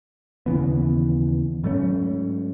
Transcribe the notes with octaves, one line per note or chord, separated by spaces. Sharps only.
D#2 C#3 E3 B3
G#2 F#3 A3 C#4